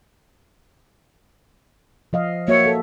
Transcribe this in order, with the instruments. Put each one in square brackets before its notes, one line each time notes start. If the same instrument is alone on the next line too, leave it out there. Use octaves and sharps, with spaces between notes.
[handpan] F3 D#5 F5
[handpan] A#3 F#4 E5 [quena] C#5
[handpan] A4